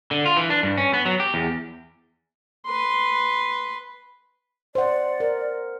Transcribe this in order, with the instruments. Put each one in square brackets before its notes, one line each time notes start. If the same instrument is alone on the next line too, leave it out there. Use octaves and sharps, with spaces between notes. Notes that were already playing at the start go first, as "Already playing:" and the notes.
[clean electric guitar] D3
F4
E3
D4
G2
C#4
B3
F#3
G4
E2
[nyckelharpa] B4 C6
[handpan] C5 F#5 [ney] D5
[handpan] A#4